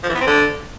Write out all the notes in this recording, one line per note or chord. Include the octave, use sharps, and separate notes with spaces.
F3
E3
B3
C4
D3